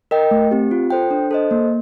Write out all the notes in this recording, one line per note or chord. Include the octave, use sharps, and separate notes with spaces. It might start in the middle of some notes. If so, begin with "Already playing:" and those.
A#4 D#5 G5
A3
C4 G4
F4
A4 C5 G5
D4
A4 C5 D#5
A#3